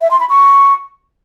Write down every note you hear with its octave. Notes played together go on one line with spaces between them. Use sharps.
E5
C6
B5
C#6